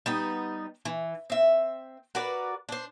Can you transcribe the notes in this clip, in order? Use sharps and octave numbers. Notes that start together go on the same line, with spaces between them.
G3 B3 D#4
E3
C4 E5
F#4 A#4 B4 D5
D4 C5